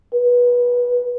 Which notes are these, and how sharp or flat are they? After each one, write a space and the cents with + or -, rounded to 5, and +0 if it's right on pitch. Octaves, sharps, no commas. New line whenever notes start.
B4 -20